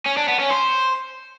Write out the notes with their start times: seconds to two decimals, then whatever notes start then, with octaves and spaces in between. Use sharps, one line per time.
0.06 C#4
0.17 D4
0.28 B3
0.40 C#4
0.51 C5